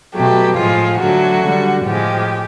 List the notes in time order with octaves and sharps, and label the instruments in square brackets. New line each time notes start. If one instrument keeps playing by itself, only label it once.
[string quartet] B2 F#3 A3 G4
A2 F3 G#3 F4
D3 F#3 A3 F#4
D3 G3
A2 F3 G#3 G4